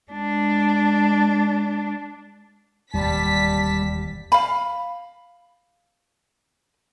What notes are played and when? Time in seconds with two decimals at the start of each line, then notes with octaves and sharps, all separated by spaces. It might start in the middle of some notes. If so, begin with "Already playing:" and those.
0.11 G#3 D4
2.94 E1 D#2 A2 G3 A5 B6
4.32 F5 B5